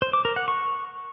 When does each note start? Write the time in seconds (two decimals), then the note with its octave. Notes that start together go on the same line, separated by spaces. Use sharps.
0.02 C5
0.13 D6
0.25 A#4
0.36 F#5
0.48 C#6